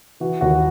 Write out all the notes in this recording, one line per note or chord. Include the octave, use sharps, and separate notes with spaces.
E3 F#4
D#2 F#4